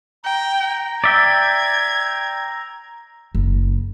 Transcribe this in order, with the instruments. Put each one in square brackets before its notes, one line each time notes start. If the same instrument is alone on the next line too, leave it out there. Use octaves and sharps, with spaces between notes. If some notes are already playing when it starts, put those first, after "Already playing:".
[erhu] G5 [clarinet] A#5
[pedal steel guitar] D5 E5 G5 [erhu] G#6
[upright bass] F#1